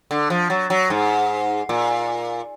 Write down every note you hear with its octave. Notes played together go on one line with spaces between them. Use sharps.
D3
F3
F#3
F#3
G#2
A#2